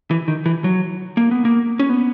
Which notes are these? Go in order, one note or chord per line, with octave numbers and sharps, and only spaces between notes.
E3
D#3
E3
F#3
A#3
B3
A#3
C#4
B3